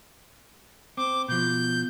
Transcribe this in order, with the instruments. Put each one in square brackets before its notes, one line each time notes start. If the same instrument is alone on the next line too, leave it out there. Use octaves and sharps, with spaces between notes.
[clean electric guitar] C4 [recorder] D6
[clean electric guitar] B2 F3 [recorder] G6